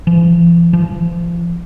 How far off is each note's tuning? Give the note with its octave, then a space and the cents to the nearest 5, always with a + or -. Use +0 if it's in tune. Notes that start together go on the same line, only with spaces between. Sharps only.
F3 -45
F3 -30